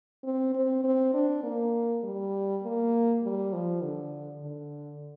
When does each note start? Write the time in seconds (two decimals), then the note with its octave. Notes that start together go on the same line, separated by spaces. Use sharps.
0.24 C4
0.55 C4
0.84 C4
1.14 D4
1.43 A#3
2.04 G3
2.64 A#3
3.23 G3
3.53 F3
3.83 D3
4.43 D3